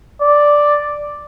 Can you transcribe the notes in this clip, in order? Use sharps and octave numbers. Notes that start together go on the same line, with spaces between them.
D5